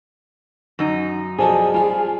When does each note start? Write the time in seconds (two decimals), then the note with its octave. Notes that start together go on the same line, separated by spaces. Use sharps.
0.79 F#2 D#4
1.39 B2 F3 D4 G#4 A4
1.74 G3 F4 F5